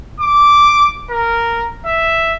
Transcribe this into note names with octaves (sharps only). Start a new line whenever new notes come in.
D6
A#4
E5